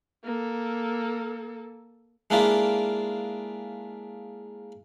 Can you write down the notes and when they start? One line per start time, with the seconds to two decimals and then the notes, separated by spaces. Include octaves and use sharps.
0.24 A#3 A4
2.30 G#3 A#3 D4 E4 F4